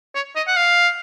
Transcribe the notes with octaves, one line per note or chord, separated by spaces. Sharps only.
C#5
D#5
F#5
F5